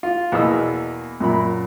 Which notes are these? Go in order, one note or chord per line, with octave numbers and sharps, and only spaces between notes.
F4
E2 B2 A#3 D#5 A#5 E6
F#2 A#2 A#4 B5